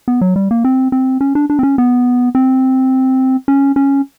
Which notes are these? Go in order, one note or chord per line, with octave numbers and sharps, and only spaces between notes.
B3
F#3
G3
A#3
C4
C4
C#4
D4
D4
C4
C#4
B3
C4
C#4
C#4